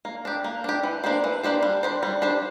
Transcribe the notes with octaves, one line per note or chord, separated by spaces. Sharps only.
A#3
D4 G4
A#3
D4 G4
E3
A#3 D4 G4 C5
E3
A#3 D4 G4 C5
G3
D4 G4 C5
G3
D4 G4 C5